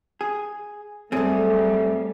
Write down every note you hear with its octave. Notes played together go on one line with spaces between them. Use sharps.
G#4
F#2 F#3 G3 A3 C4 G#4 A4